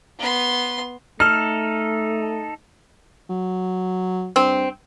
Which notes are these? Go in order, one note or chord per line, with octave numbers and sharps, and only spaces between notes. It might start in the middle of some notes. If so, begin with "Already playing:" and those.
B3 C6
A3 D#4 A4 F6
F#3
G2 C4